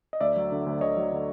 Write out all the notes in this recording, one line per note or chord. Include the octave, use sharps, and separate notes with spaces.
D#5
D2 D5 E5
F#3
D3
D2
D2 C#5 D#5
F#3
D3